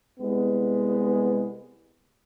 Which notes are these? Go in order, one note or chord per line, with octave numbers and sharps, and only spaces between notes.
C2 G#3 B3